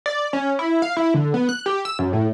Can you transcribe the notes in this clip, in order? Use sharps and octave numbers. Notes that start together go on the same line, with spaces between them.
D5
C#4
E4
F5
E4
D3
B3
F#6
G4
E6
F#2
A2